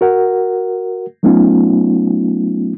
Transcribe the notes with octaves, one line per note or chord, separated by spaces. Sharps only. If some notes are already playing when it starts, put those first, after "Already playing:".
F#4 A#4 F#5
F#3 A3 B3 C#4 D#4 F4